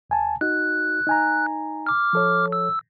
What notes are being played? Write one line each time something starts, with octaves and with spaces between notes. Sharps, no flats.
D#2 G#5 A5
D#4 F#4 F#6
D#4 G#5 A#5
D6 F6
F3 A4 C#5
E6